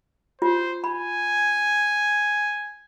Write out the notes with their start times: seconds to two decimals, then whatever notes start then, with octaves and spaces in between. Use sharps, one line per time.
0.42 F4 C5
0.84 G#5 B5